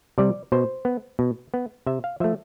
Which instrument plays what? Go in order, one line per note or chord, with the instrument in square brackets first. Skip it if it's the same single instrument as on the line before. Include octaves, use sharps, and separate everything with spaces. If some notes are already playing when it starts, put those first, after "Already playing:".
[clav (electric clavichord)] C3 G3 D5
B2 C5
B3
B2
B3
C3 E5
F5
F3 A3 E5